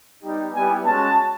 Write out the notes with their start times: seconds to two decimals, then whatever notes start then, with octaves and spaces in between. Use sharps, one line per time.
0.22 G3 B3 D#4 G4
0.53 G3 B3 E4 G4 G#5
0.85 G#3 C#4 F#4 A5